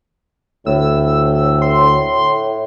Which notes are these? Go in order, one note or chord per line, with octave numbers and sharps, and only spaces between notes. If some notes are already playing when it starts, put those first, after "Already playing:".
D2 A2 E6
C6